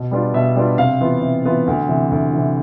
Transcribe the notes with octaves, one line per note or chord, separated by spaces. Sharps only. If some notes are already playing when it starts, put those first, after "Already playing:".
Already playing: B2
G3 B3 D4 F4
B2 E5
G3 B3 D4 F4
C3 F5
E3 B3 F4
C3
E3 B3 F4
D2
C3 E3
D2
E3
C3